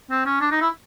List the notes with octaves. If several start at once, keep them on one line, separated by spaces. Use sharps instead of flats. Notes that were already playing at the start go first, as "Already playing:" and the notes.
C4
C#4
D4
D#4
E4